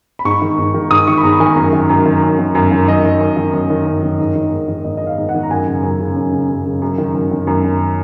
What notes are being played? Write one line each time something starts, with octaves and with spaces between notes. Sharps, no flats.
B5
G#2 C#6
D#3
G#2
D#3
G#2 D#6
D#3 C#6
B5
G#2 A#5
D#3 G#5
F#2
D#3
F#2
D#3
F#2
D#3
F#2
D#3
F#2 D#5
D#3
F#2
D#3
F#2
D#3
F#2
D#3
G#2
D#3
G#2
D#3
G#2 D#5
D#3 D#5
F5
G#2
F#5
D#3
A#5
F#2 G#5
C#3
F#2
C#3
F#2
C#3
F#2
C#3
F#2
D#3
F#2
D#3
F#2
D#3